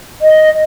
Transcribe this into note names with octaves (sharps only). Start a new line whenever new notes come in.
D#5